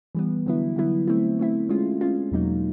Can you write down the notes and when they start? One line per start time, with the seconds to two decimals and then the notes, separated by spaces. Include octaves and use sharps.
0.15 E3 G3 B3
0.46 D3 F#3 B3 E4
0.76 D3 F#3 B3 E4
1.08 A3 C4 E4
1.39 A3 C4 E4
1.69 G#3 C#4 F4
2.01 G#3 C#4 F4
2.31 E2 B2 F#3 A#3 D#4